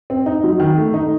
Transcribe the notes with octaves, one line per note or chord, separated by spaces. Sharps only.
C4
D#4
F#3
D#3
A3
D#4